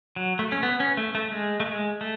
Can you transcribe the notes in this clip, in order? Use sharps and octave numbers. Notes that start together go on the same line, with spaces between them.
F#3
A3
C#4
B3
C#4
A3
A3
G#3
A3
G#3
A3